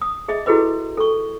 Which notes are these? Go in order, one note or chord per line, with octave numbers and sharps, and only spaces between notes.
D#6
G#4 D#5 E5
E4 F#4 G#4 A4 B4 D#5
A4 C#6